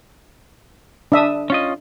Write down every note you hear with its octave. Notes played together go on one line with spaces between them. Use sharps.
D4 E5 D#6
C#4 F4 D#5